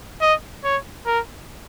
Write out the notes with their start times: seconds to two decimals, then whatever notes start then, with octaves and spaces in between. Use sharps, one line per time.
0.21 D#5
0.64 C#5
1.06 A#4